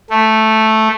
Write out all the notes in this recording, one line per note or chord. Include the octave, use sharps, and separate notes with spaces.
A3